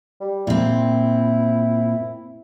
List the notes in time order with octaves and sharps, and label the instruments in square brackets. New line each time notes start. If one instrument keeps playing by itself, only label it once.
[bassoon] G3
[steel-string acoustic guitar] A#2 C4 [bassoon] E4